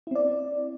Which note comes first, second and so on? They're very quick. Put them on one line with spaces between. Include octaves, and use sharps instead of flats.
E4 C4 D5